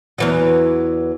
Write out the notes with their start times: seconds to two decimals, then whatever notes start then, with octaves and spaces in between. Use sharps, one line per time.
0.18 E2 E3 F#3